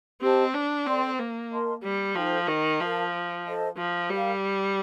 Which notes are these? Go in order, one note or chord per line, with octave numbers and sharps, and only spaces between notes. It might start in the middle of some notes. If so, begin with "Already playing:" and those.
C4 G4 C5 D#5 A5
D4
C4 A4 D5 G5 C6
A#3
A#4 D#5 A5 C6
G3
F3 D#4 A4 C5 G5
D#3
F3 A#4 F5 A5
A4 C5 D#5 A5
F3
G3 G4 A#4 F5